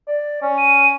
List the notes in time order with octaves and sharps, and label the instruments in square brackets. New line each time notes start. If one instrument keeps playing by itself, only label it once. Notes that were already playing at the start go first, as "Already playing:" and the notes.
[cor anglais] D5
C#4
[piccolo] D#7